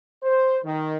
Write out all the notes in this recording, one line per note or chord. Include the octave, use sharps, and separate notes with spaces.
C5
D#3